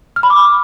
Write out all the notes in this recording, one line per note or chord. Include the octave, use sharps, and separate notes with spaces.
F6
B5
D6